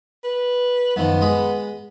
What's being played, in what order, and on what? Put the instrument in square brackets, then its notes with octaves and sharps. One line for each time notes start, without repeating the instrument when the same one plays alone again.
[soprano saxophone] B4
[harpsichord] F#2 D#3 F3 [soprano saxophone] B3
[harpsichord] G#3 G#4 B5